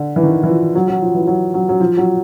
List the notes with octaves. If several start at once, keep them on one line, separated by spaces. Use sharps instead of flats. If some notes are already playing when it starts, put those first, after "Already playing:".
Already playing: D3
E3
D#3
E3
F3
F#3
F#3
F3
E3
F#3
F#3
F#3
F3
F#3